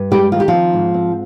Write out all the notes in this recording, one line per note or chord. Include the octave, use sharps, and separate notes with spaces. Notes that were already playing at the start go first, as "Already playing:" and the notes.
Already playing: G2
G3 G#3 G4
D#3 F4
G4
F3 C4 F4
G#2
C4